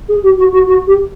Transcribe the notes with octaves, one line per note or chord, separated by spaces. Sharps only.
G#4
G4
F#4
F#4
F#4
G4